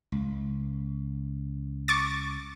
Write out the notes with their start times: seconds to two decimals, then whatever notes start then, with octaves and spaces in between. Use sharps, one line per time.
0.12 C#2
1.88 C#6 D6 A6